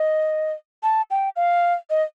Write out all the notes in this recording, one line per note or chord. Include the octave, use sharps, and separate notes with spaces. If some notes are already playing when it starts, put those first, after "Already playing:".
Already playing: D#5
A5
G5
F5
D#5